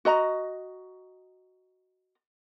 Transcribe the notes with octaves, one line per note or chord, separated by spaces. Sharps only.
F#4 D#5 A#5